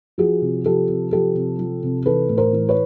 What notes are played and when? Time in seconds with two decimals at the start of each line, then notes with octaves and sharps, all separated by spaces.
0.18 F3 F#4 G#4
0.42 C3
0.65 F3 G4 A4
0.89 C3
1.12 F3 G4 A4
1.35 C3
1.59 F3
1.83 C3
2.06 E3 A4 B4
2.29 A2
2.37 A#4 C5
2.53 E3
2.69 B4 C#5